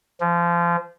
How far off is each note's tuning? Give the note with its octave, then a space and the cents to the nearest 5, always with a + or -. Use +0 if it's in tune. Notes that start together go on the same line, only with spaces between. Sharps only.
F3 -25